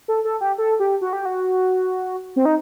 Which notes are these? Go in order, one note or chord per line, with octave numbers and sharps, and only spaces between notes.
A4
A4
G4
A4
G4
F#4
G4
F#4
C4
D#4